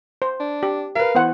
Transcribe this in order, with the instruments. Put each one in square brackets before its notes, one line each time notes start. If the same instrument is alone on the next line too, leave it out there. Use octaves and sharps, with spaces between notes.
[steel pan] C5
[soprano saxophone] D4
[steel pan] G4
[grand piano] A#4 B4 [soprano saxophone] F5
[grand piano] E3 [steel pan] B3 C5 F#5